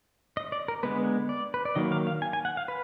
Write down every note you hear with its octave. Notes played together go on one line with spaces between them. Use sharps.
D#5
D5
A#4
D3 G#3 B3 B4
D5
B4
D5
D#3 F#3 A#3 D#5
F5
F5
G#5
G#5
F#5
F5
B4